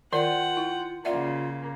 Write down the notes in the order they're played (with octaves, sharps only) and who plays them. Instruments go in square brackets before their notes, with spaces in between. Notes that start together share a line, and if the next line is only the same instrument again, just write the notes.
[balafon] D#3 A#4 D5 [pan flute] F4 [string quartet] F#5 G5
[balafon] E4
[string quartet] C#3 A#3 [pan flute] F4 [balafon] D5 E5 F#5